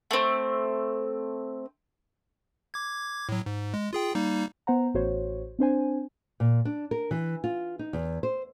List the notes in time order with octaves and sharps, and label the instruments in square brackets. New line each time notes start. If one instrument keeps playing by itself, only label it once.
[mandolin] A3 C4
[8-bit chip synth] D6 G#6
A2 F#3
G#2
G#3
F4 G#4 G5
G3 A#3 D#4
[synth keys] B3 C5 F#5 A#5
A1 F#4 C5 C#5
C4 D4 C5 G#5
[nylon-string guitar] A#2
D4
A#4
E3
F4
D#4
E2
C5